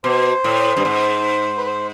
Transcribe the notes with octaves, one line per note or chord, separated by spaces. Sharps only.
B2 C5
A2
G2
G#2
B4
C5